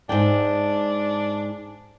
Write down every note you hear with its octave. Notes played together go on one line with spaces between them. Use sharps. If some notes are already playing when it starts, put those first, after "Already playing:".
G#2 D4 G5